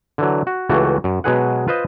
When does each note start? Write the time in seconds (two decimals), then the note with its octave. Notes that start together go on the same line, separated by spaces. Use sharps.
0.18 D3 E3 F#3
0.47 F#4
0.69 C#2 E3 A3 F#4
1.04 F#2
1.24 B2 F#3 G#3 G#4 B4 F#5
1.68 F4 B4 C5 D#5